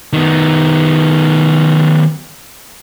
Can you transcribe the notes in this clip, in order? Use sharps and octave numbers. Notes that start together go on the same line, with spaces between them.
D#3 B3